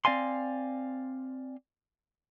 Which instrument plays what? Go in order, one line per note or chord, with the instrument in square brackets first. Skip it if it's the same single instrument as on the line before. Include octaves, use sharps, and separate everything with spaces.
[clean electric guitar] C4 D5 F5 G#5 C6